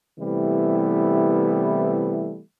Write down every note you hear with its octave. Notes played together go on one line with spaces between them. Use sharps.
C3 E3 G3 A3 B3 E4